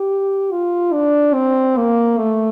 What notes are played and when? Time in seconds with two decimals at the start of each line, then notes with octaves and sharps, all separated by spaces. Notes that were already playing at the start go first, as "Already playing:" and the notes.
Already playing: G4
0.51 F4
0.93 D4
1.34 C4
1.77 A#3
2.18 A3